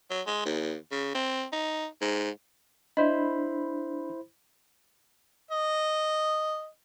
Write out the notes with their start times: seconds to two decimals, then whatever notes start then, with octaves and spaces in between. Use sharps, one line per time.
0.10 F#3
0.26 G#3
0.45 D#2
0.92 C#3
1.15 C4
1.53 D#4
2.01 G#2
2.97 D4 E4 C5 D#5 B5
5.51 D#5